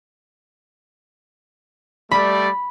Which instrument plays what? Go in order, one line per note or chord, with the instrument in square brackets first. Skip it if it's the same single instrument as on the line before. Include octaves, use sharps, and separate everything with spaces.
[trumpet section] G3 A3 D5 [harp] B5